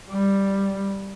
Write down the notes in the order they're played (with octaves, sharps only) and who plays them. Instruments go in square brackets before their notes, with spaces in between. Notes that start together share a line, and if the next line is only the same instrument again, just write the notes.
[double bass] G3